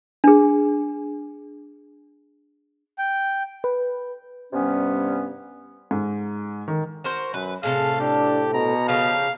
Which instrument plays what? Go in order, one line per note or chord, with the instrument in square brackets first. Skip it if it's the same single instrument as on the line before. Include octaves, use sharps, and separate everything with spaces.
[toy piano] D4 G#4
[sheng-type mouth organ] G5
[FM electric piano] B4
[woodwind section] G2 C3 G3 B3 C#4
[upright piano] G#2
D#3
[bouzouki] F#4 A#4 C5
[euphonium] F#2 [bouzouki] B4
[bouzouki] A2 C3 A4 [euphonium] G#4 [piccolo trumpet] F5
[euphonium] D4 [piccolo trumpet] G4
[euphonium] B2 [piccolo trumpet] A#5
[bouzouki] C#3 F3 G4 [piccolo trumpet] F5